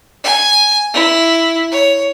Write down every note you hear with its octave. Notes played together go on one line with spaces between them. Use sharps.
G#5
E4
C#5